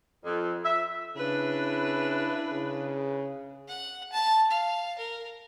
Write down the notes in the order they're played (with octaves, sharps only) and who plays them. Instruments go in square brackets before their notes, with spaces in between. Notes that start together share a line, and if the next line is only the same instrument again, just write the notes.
[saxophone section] F2
E5
[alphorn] C#3 [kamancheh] D4 B4 [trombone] E4
[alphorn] C#3
[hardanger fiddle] F#5
A5
F5
A#4